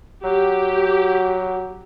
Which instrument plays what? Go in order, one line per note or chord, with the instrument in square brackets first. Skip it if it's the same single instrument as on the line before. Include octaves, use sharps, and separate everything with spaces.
[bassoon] F#3 [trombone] F#4 [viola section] G4